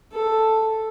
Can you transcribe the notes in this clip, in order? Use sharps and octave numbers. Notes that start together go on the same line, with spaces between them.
A4